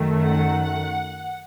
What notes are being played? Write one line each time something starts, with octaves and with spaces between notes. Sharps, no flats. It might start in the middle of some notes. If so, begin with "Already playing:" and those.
Already playing: F#2 D#3 A3
F#5